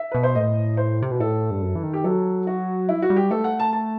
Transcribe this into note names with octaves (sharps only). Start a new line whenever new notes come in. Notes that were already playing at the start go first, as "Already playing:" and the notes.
Already playing: E5
B2 B4
C5
A2 D#5
C5
C3
B2
A2 A4
G2
F#2
E3
D#3
G4
F#3 A4
F#4
E4
F#4
G3
G4
A3 A4
F#5
A5
A5